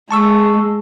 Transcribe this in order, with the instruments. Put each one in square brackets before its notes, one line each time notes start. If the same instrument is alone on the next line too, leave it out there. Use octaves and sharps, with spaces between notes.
[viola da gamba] G#3 [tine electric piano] A5 C#6 E6